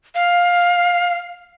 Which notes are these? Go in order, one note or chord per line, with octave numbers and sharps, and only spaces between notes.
F5